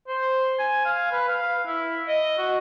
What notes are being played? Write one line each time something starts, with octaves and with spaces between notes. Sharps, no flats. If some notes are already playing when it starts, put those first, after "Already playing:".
C5
G#5
F5
B4
F5
E4
D#5
F#4